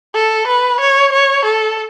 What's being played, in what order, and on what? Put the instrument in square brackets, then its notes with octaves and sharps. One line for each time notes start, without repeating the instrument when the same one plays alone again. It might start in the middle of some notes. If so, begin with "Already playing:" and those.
[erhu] A4
B4
C#5
C#5
A4